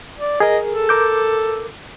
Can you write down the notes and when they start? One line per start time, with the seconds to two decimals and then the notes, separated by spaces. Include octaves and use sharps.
0.19 D5
0.40 G#4 A#4 D#5
0.68 A4
0.89 A#4 D6 G6